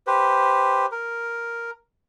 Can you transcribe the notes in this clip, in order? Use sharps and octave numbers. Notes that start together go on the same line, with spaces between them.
G4 B4 C5
A#4